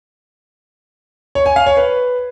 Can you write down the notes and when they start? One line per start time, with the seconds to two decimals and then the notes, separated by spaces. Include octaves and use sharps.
1.35 C#5
1.46 G#5
1.56 F5
1.66 C#5
1.77 B4